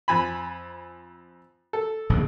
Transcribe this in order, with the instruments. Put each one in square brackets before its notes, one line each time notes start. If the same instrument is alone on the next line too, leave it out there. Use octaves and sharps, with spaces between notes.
[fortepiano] F2 G#5 B5
A4
[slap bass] D1 A#1 C#3